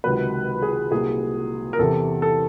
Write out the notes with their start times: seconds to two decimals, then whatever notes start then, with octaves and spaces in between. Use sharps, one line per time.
0.04 C#2 C3 D#3 F#3 B4
0.62 G#4
0.91 C2 A#2 F#3 G#4
1.73 A#4
1.79 E2 C3 E3 A4
2.22 A4